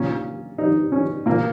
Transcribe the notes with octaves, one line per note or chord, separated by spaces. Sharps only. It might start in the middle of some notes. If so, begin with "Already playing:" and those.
Already playing: A#2 C#4
D#4
C#4
A#2 A#3